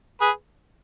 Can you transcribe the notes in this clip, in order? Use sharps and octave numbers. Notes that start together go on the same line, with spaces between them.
G#4 B4